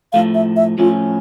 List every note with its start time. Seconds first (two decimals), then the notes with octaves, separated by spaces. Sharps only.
0.13 A2 F3 A3 F5
0.34 E5
0.56 E5
0.78 A2 F3 A3 C#4 F4